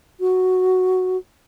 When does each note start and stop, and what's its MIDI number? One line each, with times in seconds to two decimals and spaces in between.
0.20 1.17 66